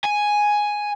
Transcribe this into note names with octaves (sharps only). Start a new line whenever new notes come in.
G#5